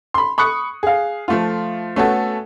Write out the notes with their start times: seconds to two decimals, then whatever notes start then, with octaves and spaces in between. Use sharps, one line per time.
0.14 B5 C6
0.38 B5 C#6 D#6 F#6 C#7
0.83 G#4 F5
1.28 F3 A3 F4
1.96 A3 B3 C#4 F#4 A4